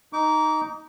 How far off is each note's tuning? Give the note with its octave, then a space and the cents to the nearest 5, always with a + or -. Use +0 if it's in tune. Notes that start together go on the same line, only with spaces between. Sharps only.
D#4 +0 D6 -30